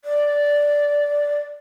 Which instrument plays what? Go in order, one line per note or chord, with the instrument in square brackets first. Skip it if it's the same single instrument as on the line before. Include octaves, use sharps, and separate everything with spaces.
[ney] D5